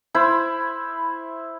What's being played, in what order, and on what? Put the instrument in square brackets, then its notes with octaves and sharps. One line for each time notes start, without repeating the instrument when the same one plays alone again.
[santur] E4 C5 B5